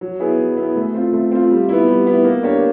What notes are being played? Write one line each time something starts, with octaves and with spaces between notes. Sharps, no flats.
F#3
B3 E4 G#4
F#3
B3 E4 G#4
A3
C4 F4
A3
C4 F4
G3
B3 E4
G3
B3 E4
A#3
D4 G4 A#4 C#5